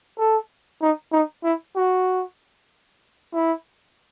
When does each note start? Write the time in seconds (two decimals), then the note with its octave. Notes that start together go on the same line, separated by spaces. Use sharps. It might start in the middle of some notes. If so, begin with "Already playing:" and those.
0.18 A4
0.82 D#4
1.13 D#4
1.44 E4
1.76 F#4
3.33 E4